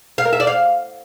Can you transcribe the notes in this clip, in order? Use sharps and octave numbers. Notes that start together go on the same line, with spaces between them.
F5
A#4
E5
D5
F5